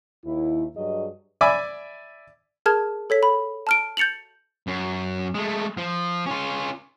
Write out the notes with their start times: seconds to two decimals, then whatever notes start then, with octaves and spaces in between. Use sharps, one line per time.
0.24 D#2 E4
0.76 G2 F#3 G#4 D#5
1.41 D5 E5 G#5 B5 D6
2.66 G#4 A#4 A5 F6 G#6
3.10 A4 C#5 B6
3.23 B5
3.67 A5 F6 D7
3.97 G6 A6 C#7 F7 F#7
4.67 F#2
5.34 G#3 A3
5.77 F3
6.26 C#4 F4